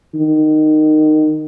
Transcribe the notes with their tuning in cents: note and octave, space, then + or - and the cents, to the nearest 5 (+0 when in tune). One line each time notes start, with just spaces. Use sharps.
D#3 -15